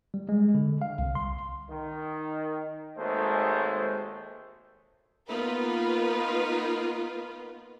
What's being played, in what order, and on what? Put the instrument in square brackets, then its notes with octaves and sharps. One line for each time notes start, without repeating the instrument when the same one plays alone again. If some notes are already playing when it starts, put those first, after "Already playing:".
[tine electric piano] G3
G#3
D3
F5
C2
C6
[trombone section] D#3
G#1 D#2 G#3 A3 C5
[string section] A#3 B3 D#4 F4 A#4 B4